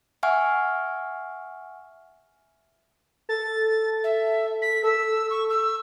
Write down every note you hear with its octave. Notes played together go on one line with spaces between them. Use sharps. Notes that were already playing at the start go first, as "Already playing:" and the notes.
E5 F#5 G#5 C#6 F6
A4 A6
E5
B6
A4 E6
C#6
E6